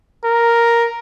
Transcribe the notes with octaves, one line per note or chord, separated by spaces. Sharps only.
A#4